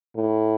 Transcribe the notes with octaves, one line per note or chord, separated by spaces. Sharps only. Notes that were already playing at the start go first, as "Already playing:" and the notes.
A2